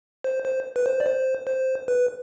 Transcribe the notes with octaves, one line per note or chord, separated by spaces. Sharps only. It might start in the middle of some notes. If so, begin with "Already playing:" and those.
C5
C5
B4
C5
D5
C5
C5
B4